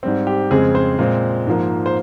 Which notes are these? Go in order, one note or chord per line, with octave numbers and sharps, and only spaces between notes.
G#2 G3 C4
G4
F2 C#3 G#3 C4 G#4
C5
A#2 G#3 C4
G#2 F3 A#3
C5